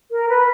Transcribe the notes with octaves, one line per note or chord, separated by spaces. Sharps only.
A#4
B4